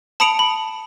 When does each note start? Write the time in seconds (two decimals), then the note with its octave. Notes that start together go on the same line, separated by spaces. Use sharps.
0.20 A5 B5 D#6 C#7 D7 F7
0.39 B5